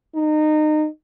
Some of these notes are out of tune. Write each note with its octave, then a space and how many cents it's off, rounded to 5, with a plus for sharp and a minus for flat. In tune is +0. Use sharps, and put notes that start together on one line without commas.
D#4 -25